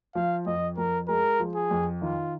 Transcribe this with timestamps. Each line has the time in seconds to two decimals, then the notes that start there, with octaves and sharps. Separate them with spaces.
0.15 F3 F5
0.46 F2 D#5
0.77 F2 A#4
1.08 G#3 A#4
1.40 F3
1.55 G#4
1.71 F2
2.02 D#3 F4